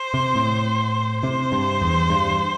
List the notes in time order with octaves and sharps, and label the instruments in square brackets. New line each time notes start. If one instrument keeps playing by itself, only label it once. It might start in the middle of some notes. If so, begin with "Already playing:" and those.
Already playing: [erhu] C5
[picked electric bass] C3
A2
[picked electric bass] C3 [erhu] C5
[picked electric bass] G2
E2
G2